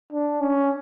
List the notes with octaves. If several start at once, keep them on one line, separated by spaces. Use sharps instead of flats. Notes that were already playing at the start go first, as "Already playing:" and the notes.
D4
C#4